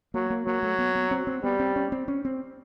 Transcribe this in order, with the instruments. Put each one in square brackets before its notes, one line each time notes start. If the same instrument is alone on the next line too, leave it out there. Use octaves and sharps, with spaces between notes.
[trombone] F#3 [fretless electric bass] A#3
[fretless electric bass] A#3
[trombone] F#3 [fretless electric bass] A#3
[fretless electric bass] A3
B3
B3
C4
C4
[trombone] G3 [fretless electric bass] B3
[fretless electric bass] C4
C#4
C4
C#4
C4